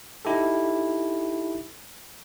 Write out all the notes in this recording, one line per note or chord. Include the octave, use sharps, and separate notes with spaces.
D#4 E4 G4 A4